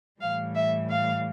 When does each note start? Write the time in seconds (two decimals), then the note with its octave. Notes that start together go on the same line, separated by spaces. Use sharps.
0.20 A2 E3 G3 F5
0.55 E5
0.90 F5